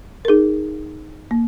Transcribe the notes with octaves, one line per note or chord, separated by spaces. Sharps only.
A#4
D#4 G#4
A#3